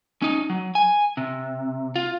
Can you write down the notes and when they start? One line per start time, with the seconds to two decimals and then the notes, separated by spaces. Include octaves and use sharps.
0.22 C#4 D#4
0.50 F#3
0.75 G#5
1.17 C3
1.96 F4